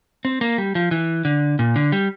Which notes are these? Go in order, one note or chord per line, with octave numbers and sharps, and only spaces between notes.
C4
A#3
G3
F3
E3
D3
A#2
D3
G3